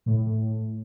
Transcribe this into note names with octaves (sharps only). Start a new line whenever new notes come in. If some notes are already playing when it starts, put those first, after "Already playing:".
A2